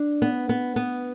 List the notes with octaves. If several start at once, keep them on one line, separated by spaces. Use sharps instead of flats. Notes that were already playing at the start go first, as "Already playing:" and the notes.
Already playing: D4
B3
B3
B3